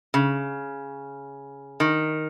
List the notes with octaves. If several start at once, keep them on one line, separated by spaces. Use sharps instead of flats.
C#3
D#3